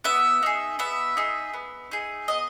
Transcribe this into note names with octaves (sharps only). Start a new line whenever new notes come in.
B3 E5
D#4 G#4
B3 E5
D#4 G#4
B3
D#4 G#4
B3 D#5